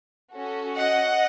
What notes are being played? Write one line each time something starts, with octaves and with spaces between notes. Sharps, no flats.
C#4 F#4 A4
D#5 F#5